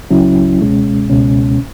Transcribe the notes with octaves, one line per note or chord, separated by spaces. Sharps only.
C#2 C#3 F#3 C#4 E4
C#2 B2 G#3 C#4
C#2 B2 G#3 C#4